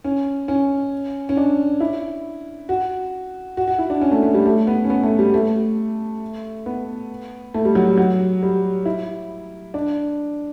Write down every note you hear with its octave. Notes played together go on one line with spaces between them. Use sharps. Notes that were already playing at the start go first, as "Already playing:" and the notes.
C#4
C#4
C#4
D4
E4
F#4
F#4
F#4
E4
D4
C#4
A3
A3
G3
A3
B3
C#4
B3
A3
G3
A3
B3
A3
G3
F#3
G3
F#3
G3
E4
D4